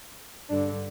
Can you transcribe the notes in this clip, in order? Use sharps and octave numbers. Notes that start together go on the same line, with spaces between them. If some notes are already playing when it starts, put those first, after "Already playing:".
G2 D3 D4